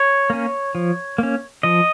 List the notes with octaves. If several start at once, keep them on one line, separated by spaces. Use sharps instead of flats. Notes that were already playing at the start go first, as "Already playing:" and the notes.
Already playing: C#5
A#3 C#4
F3
A#3 C#4
F3 D#5